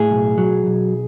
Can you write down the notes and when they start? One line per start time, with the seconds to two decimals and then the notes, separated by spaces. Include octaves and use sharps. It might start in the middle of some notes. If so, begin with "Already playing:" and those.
Already playing: A2 G#4
0.11 B1
0.38 F#3
0.67 B1